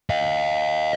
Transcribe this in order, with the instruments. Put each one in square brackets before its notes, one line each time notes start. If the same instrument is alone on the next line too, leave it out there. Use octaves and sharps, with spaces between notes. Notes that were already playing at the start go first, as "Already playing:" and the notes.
[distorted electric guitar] D#5 F5